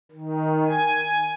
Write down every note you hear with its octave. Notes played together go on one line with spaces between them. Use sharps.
D#3
G#5